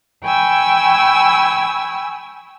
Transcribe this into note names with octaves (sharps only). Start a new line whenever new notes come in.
G5 G#5 B5 C#6 E6 G#6